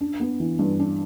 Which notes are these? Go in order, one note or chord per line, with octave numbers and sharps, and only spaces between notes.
D4
B3
E3
G2
D4